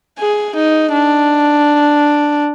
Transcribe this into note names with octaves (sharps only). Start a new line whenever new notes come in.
G#4
D#4
D4